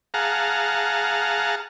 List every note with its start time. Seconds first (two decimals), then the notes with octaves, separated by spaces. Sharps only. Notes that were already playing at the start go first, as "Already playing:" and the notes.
0.14 G#4 F5 F#5 A5 A#5